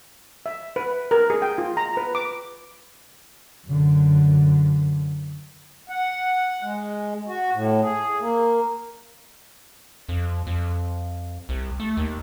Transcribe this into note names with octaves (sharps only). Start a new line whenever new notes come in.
E5
B4
A#4
G#4
G5
F4
A#5
B4
D6
F#2 D3
F#5
G#3
F#4
A2
G#4
A#3
F2
F2
C2
A3
D#2